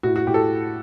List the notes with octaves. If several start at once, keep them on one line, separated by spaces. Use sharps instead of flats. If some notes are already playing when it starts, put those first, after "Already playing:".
A2 F#4
F#4
A2 G4
A4